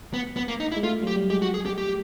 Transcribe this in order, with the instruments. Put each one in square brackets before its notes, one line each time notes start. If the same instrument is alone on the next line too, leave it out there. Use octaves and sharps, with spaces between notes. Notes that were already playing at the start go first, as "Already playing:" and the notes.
[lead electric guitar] B3
B3
A#3
D#4
E4
[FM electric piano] G#3
[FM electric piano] A3 [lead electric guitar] F4
[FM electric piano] F#3 [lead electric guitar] G4
[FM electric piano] G3
[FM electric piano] G#3 [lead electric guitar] G4
[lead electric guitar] F#4
G#4
G4
G4